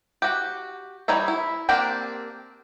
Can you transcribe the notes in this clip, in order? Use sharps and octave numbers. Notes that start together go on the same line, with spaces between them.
F#4 G4
E3 G3 D#4 C#5 E5
E4
A#3 C4 D4 G4 A#4